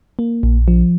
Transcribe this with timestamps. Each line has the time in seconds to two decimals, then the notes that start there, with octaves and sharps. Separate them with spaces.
0.19 A#3
0.43 A#1
0.68 F3